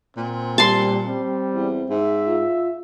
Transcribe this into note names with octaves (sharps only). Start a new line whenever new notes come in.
A#2 C4
G3 A5 C6
G3 C4
E2
G#2 E5
F4